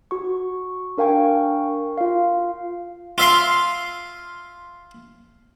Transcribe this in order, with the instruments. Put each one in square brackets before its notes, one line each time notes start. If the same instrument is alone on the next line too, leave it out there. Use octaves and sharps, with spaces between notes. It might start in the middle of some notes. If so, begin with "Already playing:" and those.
[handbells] F#4 C#6
D4 A#4 F5 G5 G#5 C#6
F4 F5
[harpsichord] F4 E5 F5 C6